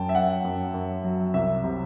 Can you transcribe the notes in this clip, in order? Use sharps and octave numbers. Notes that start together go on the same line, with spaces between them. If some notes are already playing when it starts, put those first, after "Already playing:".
Already playing: F#2 F#3 G5 A5
E5
F#2 F#5
F#2
F#2
F#3
C2 E5
C3